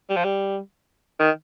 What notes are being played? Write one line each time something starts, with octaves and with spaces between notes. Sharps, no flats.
G3
F3
G3
D#3